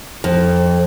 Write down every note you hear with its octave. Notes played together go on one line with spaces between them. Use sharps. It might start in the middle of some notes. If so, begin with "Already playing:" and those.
F2